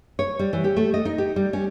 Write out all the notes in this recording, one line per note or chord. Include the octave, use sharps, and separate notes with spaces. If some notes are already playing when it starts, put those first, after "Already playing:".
C#5
G3
E3
G4
A3
D#5
D#4
G4
G3
C#4